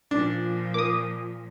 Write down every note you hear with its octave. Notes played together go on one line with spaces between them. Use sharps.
A#2 F3 D4
A#3 D6 D#6